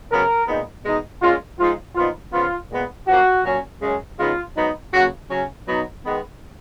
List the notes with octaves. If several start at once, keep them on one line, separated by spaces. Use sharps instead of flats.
C#3 F#3 B3 A#4
A#2 G#3 B3 D#4
B2 G#3 D#4
A#2 G#3 C#4 F4
G#2 F3 G#3 D#4 F4
A#2 F3 B3 D#4 F4
C#3 F3 B3 F4
A#2 G#3 B3
F#2 F3 A#3 F#4
A#2 F#3 C#4
F#2 C#3 G#3 C#4
C#3 G#3 B3 D#4 F4
G#2 F#3 B3 D#4
C#3 F#3 A#3 F#4
C#3 F#3 C#4
B2 F#3 B3 D#4
D#3 G#3 B3